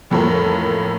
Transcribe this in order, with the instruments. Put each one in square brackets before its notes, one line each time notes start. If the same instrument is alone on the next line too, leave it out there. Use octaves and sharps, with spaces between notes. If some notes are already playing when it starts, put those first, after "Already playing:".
[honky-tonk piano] A1 F2 A2 A#3 A#4